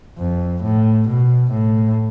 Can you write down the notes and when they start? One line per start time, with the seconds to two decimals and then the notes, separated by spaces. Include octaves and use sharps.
0.18 F2
0.63 A2
1.08 B2
1.51 A2